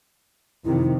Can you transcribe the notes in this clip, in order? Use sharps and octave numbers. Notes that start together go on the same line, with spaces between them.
F2 C3 D#3 E4